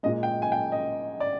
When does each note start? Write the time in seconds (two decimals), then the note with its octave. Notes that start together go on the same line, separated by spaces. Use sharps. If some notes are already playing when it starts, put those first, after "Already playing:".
0.03 A#2 G#3 D#5
0.23 G5
0.42 G#5
0.52 G5
0.72 D#5
1.20 D5